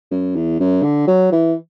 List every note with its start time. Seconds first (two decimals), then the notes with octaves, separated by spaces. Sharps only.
0.11 F#2
0.35 E2
0.60 F#2
0.83 D3
1.07 F#3
1.32 E3